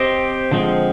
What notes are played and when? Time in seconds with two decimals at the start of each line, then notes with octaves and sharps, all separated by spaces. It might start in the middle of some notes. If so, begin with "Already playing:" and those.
Already playing: C4 G4 C5 D#5
0.51 D3 F3 G#3 C4